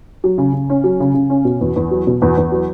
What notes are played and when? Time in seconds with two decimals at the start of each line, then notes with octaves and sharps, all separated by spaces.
0.24 F#3
0.38 C#3
0.53 C#3
0.70 C#4
0.84 F#3
1.00 C#3
1.14 C#3
1.30 C#4
1.45 B2
1.61 E2
1.76 E2
1.91 F#3
2.07 B2
2.22 E2
2.37 E2
2.52 F#3